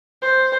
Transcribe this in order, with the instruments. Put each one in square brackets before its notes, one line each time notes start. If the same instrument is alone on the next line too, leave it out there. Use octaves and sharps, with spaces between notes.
[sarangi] C5